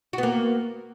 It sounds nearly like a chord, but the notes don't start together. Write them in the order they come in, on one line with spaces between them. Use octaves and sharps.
F#4 B3 A#3